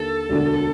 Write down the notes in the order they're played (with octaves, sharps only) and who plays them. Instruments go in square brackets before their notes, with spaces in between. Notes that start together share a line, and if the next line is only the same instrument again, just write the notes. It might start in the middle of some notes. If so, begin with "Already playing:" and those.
Already playing: [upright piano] D#2 D3 A#3 [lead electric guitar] A4
[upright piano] E1 D2 D3